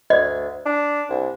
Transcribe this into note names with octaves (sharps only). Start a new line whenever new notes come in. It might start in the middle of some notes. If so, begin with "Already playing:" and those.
D2 D5 D#5
D4
C2